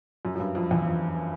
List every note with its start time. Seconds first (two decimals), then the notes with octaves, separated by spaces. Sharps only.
0.25 F#2
0.35 F#2
0.40 G2
0.55 F2
0.71 E2
0.86 F2